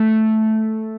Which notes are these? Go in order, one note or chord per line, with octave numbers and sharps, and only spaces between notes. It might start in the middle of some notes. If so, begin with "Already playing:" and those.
Already playing: A3